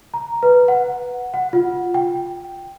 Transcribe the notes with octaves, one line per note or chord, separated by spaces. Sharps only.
A#5
B4
F#5
F#5
F4
G5